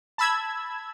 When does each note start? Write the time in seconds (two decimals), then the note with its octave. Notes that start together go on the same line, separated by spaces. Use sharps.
0.18 A5 B5 E6 G#6